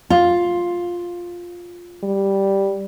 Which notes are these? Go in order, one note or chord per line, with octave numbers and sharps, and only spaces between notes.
F4
G3